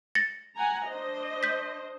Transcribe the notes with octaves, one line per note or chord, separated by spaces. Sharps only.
A6 A#6 C#7
F#5 G#5 A#5
D4 C5 D#5
G6 B6